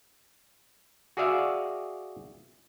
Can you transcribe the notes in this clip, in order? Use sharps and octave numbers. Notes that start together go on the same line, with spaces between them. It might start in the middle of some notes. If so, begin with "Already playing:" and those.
F#4 G#4 D5 E5 F5